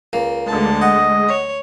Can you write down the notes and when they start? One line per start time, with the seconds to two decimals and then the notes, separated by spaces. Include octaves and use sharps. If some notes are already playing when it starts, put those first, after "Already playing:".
0.13 C#2 A#3
0.46 D2 D3 G#3 A5
0.82 D#5 F#5
1.27 C#5